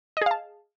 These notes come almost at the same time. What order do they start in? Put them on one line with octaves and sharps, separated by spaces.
D#5 G#4 F5 A5